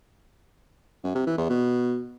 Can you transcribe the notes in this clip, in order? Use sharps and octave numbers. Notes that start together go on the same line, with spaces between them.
F#2
C3
E3
E2
B2